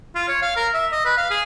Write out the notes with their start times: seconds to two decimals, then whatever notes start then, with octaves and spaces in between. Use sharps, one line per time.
0.15 F4
0.28 C#5
0.42 F5
0.56 A#4
0.74 E5
0.92 D#5
1.05 B4
1.17 F5
1.30 G#4